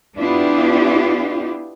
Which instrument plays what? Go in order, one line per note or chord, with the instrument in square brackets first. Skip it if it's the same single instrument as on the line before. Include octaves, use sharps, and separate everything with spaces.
[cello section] B3 D4 E4 F4 G4